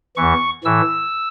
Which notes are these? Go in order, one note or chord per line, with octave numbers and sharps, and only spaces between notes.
E2 E3 C#6
A2 E3 E6